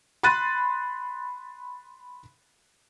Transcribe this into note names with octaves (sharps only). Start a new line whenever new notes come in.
B5 C6 F#6 A6 D#7